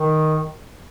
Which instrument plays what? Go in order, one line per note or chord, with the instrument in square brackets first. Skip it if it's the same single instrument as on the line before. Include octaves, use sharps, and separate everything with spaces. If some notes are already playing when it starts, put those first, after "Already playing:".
Already playing: [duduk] D#3